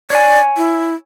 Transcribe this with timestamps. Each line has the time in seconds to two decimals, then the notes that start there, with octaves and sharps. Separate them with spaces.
0.10 C#5 D5 G#5
0.57 E4